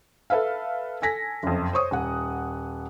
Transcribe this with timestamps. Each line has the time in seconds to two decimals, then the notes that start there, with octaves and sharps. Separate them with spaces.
0.30 A4 B4 E5 F5
1.02 A4 G#5 A#6 B6
1.43 F#1 F2
1.73 C5 C#5 C#6 D#6
1.91 D#1 F#5